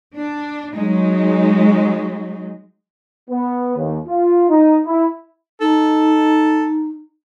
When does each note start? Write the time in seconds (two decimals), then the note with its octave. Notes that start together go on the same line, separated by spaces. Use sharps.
0.14 D4
0.75 F#3 G#3 D#4
3.30 B3
3.77 D#2
4.08 F4
4.49 D#4
4.86 E4
5.61 D#4 A4